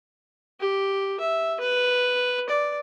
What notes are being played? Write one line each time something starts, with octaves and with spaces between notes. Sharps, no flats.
G4
E5
B4
D5